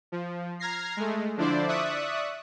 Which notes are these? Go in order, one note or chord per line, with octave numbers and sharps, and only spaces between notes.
F3
A#5 F6 G#6 A#6 C7
G#3 A3
D3 F3 D4 E4 C5 D5
D5 E5 C#6 D#6 F#6